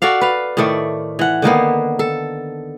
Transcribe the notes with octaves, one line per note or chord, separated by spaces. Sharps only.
F#4 A4 D5 F5
B4 F5
A2 D#3 A3 D5
E3 F#5
D3 D#3 A#3 B3
A4